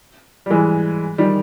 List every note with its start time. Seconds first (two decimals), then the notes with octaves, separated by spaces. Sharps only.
0.46 G3
0.50 E3 G#3
1.18 D#3 G3